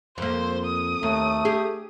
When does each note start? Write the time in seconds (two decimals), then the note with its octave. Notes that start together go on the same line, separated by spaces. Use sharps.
0.18 F2 A#3 C5
0.66 D#6
1.03 D#2 A3
1.45 G4 G#4